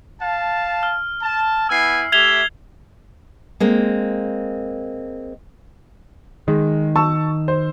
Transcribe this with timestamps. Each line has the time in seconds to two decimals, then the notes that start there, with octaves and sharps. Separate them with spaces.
0.21 F5 A5
0.83 F6
1.22 A5
1.69 B3 E4 G#5 E6 C7
2.12 A3 G4 E5 G#6 F7 G7
3.60 G#3 A#3 C4
6.48 D#3 G#3
6.96 A5 C#6 E6
7.48 C5